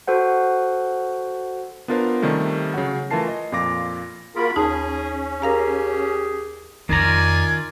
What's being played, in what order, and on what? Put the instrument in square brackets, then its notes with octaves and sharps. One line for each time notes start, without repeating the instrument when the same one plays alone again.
[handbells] F#4 A4 C5 F#5
[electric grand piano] B3 D4 F4 A#4 C5 F5
C3 D#3 G3 A3 C#4
C#3 F#3 F#5
E3 A3 F4 A#4 A5 C7
D#5
F2 A#2 F4 F5 D6 A#6
[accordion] A#3 F4 A#4 [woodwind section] F#4 G#4 B5
[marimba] D#2 D#4 A5 [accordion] C#4 [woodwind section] G#4
[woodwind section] G4 G#4 [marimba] A#4 F5 A#5
[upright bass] F2 E4 [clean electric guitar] D#3 A#5 [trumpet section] F4 D5 G#5